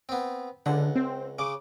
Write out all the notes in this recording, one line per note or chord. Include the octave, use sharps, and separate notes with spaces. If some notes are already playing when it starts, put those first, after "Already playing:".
B3 C4
C#2 D3 F#5
C4
C#3 D6